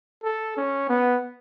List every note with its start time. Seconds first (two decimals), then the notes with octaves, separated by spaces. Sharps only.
0.24 A4
0.57 C#4
0.89 B3